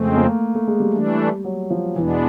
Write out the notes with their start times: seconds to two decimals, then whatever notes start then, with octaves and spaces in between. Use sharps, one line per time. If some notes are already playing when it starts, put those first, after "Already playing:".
Already playing: F2 C#3 F3 G#3 A3 C4
0.16 A#3
0.55 A3
0.68 G#3
0.80 G3
0.93 E3 A3 D4
1.44 F#3
1.70 F3
1.96 E2 B2 E3 G#3 B3 D4